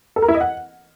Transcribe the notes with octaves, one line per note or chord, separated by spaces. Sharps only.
A4
A#4
E4
D#5
F#5